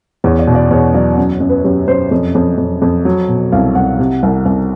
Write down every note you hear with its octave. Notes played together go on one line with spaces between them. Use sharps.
E2 C#5
D5
B2
D5
E2 C#5
F#3 D5
F#2
F#2
B4
F#2 G4
F#2 C5
F2
F2
F2
F2
F#3
B2
C2 F5
C2 F#5
C3
C2
C2